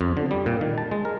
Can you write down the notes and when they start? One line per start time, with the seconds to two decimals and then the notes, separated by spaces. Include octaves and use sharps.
0.01 F2
0.17 D3
0.31 G3
0.46 A#2
0.61 D#3
0.78 A5
0.91 G#3
1.05 A#4